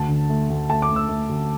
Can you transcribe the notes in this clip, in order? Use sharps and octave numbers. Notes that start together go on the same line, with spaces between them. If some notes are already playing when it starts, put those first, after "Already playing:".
Already playing: D2 A5
D3
A3
D2
A3 A5
D6
D2
E6
A3
D2